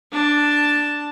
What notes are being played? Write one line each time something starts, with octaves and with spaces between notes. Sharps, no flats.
D4 A5